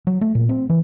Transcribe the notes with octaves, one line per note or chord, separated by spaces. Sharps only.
F#3
A3
A#2
C4
E3